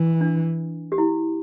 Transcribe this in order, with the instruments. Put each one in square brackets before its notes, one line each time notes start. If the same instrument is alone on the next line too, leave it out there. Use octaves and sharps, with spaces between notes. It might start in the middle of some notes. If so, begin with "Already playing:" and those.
Already playing: [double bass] E3
[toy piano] D4
G4
E4